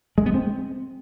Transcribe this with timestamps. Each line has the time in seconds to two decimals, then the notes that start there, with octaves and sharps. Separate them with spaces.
0.18 G#3
0.26 B3
0.34 C4